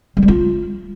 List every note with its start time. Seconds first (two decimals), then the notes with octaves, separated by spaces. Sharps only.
0.17 G3
0.22 G#3
0.28 F4